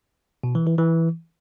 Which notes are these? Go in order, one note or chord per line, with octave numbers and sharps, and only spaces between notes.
B2
E3
E3
E3